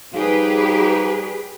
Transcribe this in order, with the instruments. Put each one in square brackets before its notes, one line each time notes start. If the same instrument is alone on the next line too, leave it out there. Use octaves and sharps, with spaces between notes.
[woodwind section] F3 G3 D#4 [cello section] G4 G#4 B4